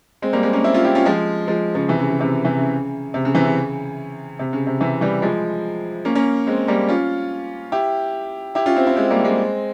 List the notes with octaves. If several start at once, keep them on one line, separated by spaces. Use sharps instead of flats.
G#3 C4
G3 A#3
G#3 C4
A#3 C#4
C4 E4
C#4 F4
E4 G4
C#4 F4
F3 G#3
F3 G#3
C#3 F3
C3 E3
C#3
C#3
C3 E3
C3 E3
C#3
C3
C#3
C3 E3
C#3
C3
C#3
C3
C3 E3
E3 G3
F3 G#3
A#3 C#4
A#3 C#4
G#3 C4
G3 A#3
C#4 F4
E4 G4
E4 G4
C#4 F4
C4 E4
C4 E4
G#3 C4
G3 A#3
G#3 C4